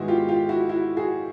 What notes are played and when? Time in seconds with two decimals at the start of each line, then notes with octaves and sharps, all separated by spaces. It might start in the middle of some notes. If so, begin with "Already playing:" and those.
Already playing: G#2 D#3 G#3 B3 E4 F#4
0.08 F4 G4
0.29 F4 G4
0.49 E4 F#4
0.69 E4 F#4
0.97 F#4 G#4